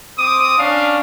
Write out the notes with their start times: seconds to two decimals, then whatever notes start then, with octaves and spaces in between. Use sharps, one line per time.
0.18 C4 D6 D#6
0.59 C#4 D4 F5